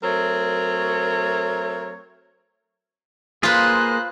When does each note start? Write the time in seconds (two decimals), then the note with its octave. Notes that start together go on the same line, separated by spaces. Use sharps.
0.04 F#3 A3 C4 A#4 C#5
3.43 A#3 F4 G#4 B4 C5 F#6